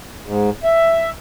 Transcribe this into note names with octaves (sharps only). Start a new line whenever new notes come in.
G#2
E5